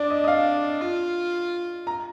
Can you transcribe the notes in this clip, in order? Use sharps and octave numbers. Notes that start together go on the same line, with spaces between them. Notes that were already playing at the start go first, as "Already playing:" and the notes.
Already playing: D4 D5
D#5
D#5
F5
F4
A#5